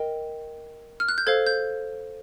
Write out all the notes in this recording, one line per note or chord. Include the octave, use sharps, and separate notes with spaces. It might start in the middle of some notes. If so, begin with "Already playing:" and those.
Already playing: A#4 D#5 G5
F6
F#6
G6
A4 C5 F5 G#6
G6